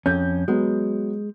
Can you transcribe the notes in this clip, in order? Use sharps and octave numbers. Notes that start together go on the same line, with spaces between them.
F2 C#4 G6
F#3 G#3 B3